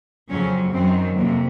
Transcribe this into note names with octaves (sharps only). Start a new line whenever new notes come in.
F2 C#3 F#3 C#4
F#2 D#3 F#3 C4
F2 C3 A#3